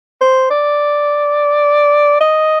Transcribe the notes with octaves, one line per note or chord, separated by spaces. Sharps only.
C5
D5
D#5